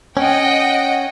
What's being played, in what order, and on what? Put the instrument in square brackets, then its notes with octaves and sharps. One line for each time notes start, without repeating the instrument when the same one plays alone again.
[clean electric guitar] C#4 [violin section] D#5 F#5 G5